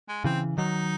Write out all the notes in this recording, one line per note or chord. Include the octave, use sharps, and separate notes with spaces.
G#3
C#3 E3 C4
D#3 F#3 D#4